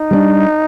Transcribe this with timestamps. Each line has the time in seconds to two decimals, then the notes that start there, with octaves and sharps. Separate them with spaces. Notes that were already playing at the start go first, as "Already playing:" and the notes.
Already playing: D#4
0.11 G3 A#3 D4